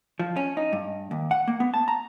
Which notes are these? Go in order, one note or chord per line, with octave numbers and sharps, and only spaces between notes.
F3
C#4
D#4
G2
D#2
F#5
A#3
B3
A5
A#5